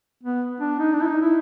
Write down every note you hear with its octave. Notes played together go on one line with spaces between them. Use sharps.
B3
D4
D#4
D4
E4
D#4
E4